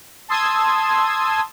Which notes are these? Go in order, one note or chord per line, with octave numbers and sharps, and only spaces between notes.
A5 C6 D#6 E6 G#6